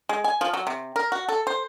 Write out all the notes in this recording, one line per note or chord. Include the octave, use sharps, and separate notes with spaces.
G#3
G#5
F3
F#3
C3
A#4
F#4
A4
C5